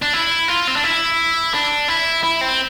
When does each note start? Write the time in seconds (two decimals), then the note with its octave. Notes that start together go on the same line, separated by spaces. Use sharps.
0.02 D4
0.13 E4
0.48 F4
0.67 C4
0.76 D4
0.84 E4
1.54 D4
1.88 E4
2.23 E4
2.41 C4